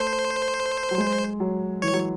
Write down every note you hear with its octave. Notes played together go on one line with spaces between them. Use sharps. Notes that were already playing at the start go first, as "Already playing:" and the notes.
Already playing: A3 C5
F#3
G#3
F#3
E3 C#5
F#3